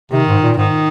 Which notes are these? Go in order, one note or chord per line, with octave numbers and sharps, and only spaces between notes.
C3 D#3
G#2
A#2
G#2 D#3